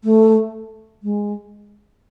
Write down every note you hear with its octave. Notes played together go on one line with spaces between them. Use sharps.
A3
G#3